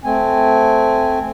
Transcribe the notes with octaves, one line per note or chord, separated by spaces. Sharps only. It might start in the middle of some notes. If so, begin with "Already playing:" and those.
A3 C4 G#5